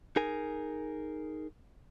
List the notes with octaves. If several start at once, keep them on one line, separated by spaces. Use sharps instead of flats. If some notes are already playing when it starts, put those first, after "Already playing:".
D#4 G#4 A#4 G#5